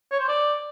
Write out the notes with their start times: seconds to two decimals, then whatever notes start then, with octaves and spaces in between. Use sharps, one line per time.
0.11 C#5
0.19 C5
0.28 D5